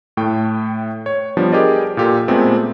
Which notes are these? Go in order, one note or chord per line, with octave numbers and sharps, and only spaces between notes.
A2 A3 G5
C#5
F3 G3 B3 D4
G4 G#4 A#4 D5 D#5
A#2 F4 G4 A4
A#2 G#3 A3 B3 C4